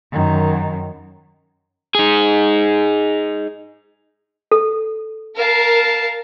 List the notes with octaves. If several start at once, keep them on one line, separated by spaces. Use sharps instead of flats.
F#2 D#3
D#4 G#4
A4
A#4 F5 A5